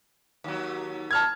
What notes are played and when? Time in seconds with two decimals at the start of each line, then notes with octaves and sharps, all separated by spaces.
0.44 D#2 F#3
1.11 A5 F6 G#6